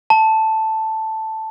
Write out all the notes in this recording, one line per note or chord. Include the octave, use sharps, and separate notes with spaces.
A5